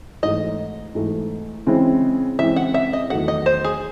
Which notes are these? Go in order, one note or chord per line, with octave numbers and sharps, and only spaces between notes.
G#2 E3 A3 D#5
G#2 E3 A3
C#3 E3 G#3 C4 E4
C#3 E3 G#3 C4 E4 E5
F#5
E5
D#5
E2 D#3 F#3 A3 F#5
D#5
C5
G#4